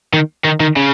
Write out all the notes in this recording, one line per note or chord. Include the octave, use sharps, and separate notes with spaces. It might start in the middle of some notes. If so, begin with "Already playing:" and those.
D#3
D#3
D#3
C#3